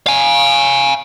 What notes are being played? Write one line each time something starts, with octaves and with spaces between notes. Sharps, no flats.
F5 G#5